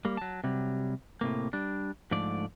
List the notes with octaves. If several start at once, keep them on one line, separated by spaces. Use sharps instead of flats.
G3 A#3
F#3 A5
C3 F#3 G3
A2 C3 A#3
G3 D4
G#2 D3 F3 A3 D5